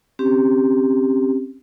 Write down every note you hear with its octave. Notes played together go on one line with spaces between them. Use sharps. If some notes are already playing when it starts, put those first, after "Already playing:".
C4 C#4 G4